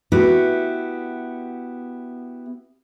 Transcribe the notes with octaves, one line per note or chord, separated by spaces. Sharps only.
B3 E4 F#4 G4